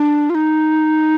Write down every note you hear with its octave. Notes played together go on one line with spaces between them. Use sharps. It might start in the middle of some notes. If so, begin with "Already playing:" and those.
Already playing: D4
F4
D#4